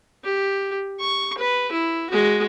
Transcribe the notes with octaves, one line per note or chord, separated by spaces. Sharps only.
G4
C#6
B4
E4
G#3 F#4